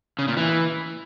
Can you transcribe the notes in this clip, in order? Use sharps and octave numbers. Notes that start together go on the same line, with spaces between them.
C#3
A#2
E3